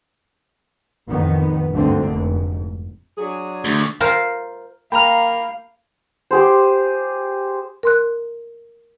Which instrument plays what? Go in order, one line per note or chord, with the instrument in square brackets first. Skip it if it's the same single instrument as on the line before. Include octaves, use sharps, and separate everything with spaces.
[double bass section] A1 F2 D#3 B3
G1 D2 G#2 D3 A#3 C4
F1 G#2
[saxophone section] F#3 D4 G#4
[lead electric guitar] D2
[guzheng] F4 A#4 C5
[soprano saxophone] A#3 [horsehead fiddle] F5 [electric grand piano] G5 A#5 F6 [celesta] B5 F7
[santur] G4 G#4 C5
[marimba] A#4 C6 F#6